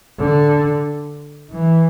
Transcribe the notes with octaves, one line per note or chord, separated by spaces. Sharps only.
D3
E3